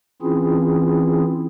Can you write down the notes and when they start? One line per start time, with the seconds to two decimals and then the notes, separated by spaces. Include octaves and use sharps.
0.22 E3 C4 C#4 E4 F4 G#4